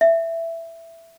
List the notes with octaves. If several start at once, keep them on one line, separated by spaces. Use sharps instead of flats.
E5